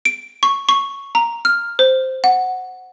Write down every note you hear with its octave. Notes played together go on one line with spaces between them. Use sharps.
D7
C#6
C#6
A#5
F6
C5
F#5